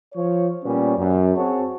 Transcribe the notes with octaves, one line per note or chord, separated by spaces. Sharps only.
F3 C#5
A#2 G3 B3 C#4
F#2
C4 F#4 G#4 C#5 A5